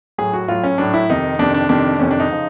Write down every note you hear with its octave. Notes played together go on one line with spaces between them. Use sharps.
A2 F#3 G#4
F#4
A2 F#3 F4
C#4
A2 F#3 D4
E4
F2 C3 D#3 D#4
F2 C3 D#3 D4
D4
F2 C3 D#3 D4
F2 C3 D#3 C#4
D4
D#4
C#3 F3